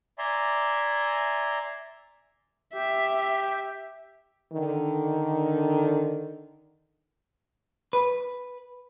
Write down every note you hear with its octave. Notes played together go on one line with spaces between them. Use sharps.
D5 E5 G#5 A#5 C6
G4 E5
D3 D#3
B4